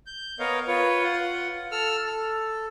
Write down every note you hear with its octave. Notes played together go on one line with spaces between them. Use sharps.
G6
B3 A#4 C#5 D#5 F5
F4 B4 C#5
F4 F#5
A4 E6 F6
A4